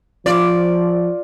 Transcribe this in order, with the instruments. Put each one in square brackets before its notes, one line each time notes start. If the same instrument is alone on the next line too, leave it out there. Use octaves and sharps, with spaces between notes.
[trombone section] F3 [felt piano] F4 [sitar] D5